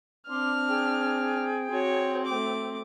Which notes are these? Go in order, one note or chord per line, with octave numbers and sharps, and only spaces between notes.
C4 D4 C6 D6 F6
G#4 G5
C4 F#4 C#5
A3 D6